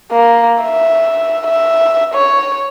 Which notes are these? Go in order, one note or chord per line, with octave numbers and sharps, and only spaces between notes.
A#3
E5
E5
C#5